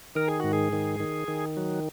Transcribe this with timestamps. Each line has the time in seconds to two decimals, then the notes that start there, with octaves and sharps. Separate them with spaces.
0.15 D#3 A#4
0.28 G#4
0.40 G#2 F#4
0.53 G#4
0.73 D#3
1.00 D#3
1.28 D#3
1.57 F#3